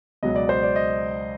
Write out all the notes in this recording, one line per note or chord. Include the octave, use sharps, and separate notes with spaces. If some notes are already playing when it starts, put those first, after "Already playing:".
C#2 B2 F#3 D#5
D5
C5
D5
D#5